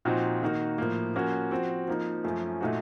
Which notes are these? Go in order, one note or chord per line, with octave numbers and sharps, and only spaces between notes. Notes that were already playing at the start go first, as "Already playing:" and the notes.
A#2 F3 C4 D#4 F#4
D#3 A#3 D#4 F#4
A2 F3 A#3
F3 A#3 C#4 F#4
F3 C4 F#4
F3 A#3 D#4
F#2 F3 A3 C#4
A#2 A3 D#4 F#4